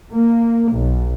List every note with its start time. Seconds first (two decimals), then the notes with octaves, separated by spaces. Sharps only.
0.14 A#3
0.74 B1